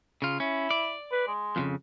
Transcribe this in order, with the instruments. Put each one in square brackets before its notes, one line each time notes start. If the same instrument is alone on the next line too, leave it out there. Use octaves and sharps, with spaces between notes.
[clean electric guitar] C#3 F4
[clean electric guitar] C#4 [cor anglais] E4
[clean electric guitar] D5
[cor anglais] B4
G#3
[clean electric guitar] F2 A#2 C#3